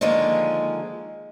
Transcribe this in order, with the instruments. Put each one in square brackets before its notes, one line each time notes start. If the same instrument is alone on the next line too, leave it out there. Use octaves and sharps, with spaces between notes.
[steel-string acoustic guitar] D3 D#3 F3 G#3 A#3